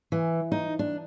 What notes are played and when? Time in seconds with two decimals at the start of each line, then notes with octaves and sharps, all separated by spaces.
0.12 E3
0.52 D#4
0.79 D4